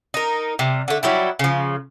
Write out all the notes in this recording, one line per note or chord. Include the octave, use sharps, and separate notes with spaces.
D#4 A#4
C3 G3
D3 A3
F#3 G3 E4
C#3 F3